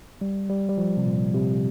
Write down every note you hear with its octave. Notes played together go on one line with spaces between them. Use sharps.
G3
G3
G3
F3
C3
A#2
C3